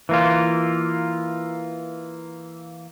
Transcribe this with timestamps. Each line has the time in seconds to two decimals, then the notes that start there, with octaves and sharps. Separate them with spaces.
0.09 E3 A#3 F4